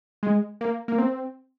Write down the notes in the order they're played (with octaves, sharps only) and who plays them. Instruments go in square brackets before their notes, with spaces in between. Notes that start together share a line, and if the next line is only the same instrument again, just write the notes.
[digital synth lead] G#3
A#3
A#3
C4